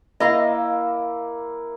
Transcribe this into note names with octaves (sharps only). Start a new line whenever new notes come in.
A#3 E4 D#5 F5